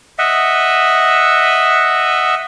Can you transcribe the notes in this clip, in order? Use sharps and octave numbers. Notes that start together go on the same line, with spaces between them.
D#5 E5 F#5